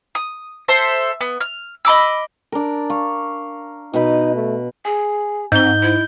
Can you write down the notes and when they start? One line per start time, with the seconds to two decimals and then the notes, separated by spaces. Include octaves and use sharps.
0.15 D#6
0.68 A4 C5 E5
1.21 B3
1.41 F6
1.85 D#5 B5 D6 E6
2.52 D4 A#4
2.90 F5 C#6
3.94 B2 D#4 B4
4.34 A3
4.85 G#4 G#5
5.52 G#2 C4 D#5 G6 G7
5.83 E4